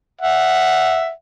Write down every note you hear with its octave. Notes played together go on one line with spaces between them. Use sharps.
E5 F#5